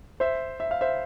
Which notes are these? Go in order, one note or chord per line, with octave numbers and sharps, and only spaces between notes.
C5 E5
E5
F5
C5 E5